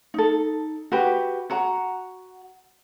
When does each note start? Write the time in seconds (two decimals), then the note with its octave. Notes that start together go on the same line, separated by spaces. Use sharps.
0.14 D#4 A4
0.92 F#4 G4 B4
1.50 F#4 F#5 A#5